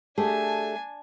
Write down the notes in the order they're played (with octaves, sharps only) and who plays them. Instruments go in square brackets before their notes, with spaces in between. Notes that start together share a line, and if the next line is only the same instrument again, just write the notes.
[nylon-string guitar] A3 G4 G#4 [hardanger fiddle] D4 G#5